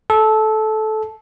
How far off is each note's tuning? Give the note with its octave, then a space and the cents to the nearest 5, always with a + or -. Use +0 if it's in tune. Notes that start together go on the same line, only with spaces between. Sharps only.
A4 -15